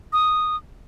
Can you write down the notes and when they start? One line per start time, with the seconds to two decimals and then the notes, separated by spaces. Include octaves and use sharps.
0.13 D#6